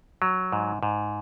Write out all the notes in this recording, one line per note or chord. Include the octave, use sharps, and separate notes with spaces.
F#3
G#2
G#2